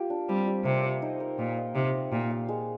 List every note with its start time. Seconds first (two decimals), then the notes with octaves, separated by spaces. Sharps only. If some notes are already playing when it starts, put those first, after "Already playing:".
Already playing: A#3 F4 G4
0.10 D4
0.29 G3 C4
0.47 G3
0.65 C3 A#3
0.83 C5
1.02 D#4
1.20 A#4
1.39 A#2 D#4
1.57 D#5
1.75 C3 D#4
1.93 F5
2.12 A#2 G4
2.30 F5
2.49 G#3